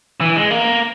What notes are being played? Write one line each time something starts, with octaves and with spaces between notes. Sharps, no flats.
E3
G#3
A#3